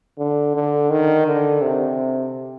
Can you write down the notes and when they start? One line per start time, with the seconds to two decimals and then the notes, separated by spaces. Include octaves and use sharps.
0.18 D3
0.55 D3
0.90 D#3
1.26 D3
1.62 C3